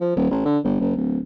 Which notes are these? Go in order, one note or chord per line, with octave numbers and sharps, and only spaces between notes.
F3
D#1
A1
D3
G1
F#1
D1